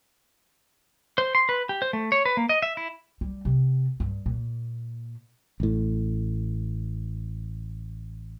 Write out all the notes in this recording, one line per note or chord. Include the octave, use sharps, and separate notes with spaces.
C5
C6
B4
G4
C5
A3
C#5
B4
A#3
D#5
E5
E4
G3
C3
G2
A#2
A1 A2